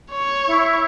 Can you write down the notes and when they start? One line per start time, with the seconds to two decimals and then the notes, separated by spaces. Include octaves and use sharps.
0.13 C#5
0.47 E4